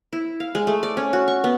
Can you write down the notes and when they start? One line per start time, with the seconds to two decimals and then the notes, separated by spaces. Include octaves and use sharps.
0.13 E4
0.40 F5
0.55 G#3
0.67 A3
0.83 D5
0.97 C#4
1.13 F#4
1.28 C#6
1.44 B3